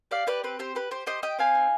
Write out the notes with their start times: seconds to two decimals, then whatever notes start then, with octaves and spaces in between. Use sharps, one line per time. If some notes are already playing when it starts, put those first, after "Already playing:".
0.11 G4 D5 F5
0.27 G4 B4 D5
0.44 C4 B4
0.59 G4 C5
0.75 G4 B4
0.91 G4 C5
1.06 G4 C5 D#5
1.22 G4 D#5 G5
1.39 C4 F5 G#5
1.55 D#4